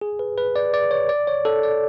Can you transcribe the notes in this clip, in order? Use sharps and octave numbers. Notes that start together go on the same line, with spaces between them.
G#4
B4
B4
D5
D5
C#5
D5
C#5
A4
D5